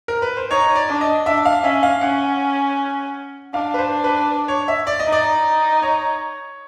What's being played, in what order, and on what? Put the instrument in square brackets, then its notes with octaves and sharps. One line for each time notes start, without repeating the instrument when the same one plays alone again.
[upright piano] A#4
B4
C5
[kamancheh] D#4 [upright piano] C#5
[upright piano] D5
[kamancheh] D4
[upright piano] D#5
[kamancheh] D4 [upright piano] E5
[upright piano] F5
[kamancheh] C#4 [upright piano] E5
[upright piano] F5
[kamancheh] C#4 [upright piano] F#5
[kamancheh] D4 [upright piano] F5
[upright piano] B4
C5
B4
C#5
E5
D5
D#5
[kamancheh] D#4
[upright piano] D5
C#5